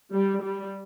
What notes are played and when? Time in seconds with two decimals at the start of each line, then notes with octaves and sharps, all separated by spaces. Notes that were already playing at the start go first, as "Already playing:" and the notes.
0.13 G3
0.42 G3